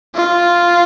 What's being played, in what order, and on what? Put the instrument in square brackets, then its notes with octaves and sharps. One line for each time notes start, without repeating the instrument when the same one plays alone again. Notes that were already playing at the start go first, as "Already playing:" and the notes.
[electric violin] F4